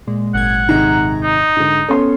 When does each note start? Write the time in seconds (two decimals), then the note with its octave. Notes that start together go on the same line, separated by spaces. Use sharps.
0.07 A#2 G#3
0.34 G#1 F#2 F#5 G#6
0.69 G#2 C3 D#3 A#5
1.24 D#4
1.56 G#2 D3
1.89 B3 C#4 A4 C#5 C6